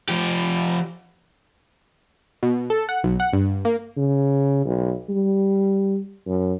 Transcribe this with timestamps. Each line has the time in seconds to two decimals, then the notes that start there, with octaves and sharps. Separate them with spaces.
0.09 F3 G4
2.43 B2
2.70 A4
2.89 F#5
3.04 B1
3.20 F#5
3.33 G2
3.65 A#3
3.96 C#3
4.65 B1
5.09 G3
6.26 F#2